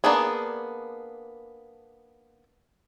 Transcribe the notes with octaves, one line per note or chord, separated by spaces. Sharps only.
A#3 B3 D4 G#4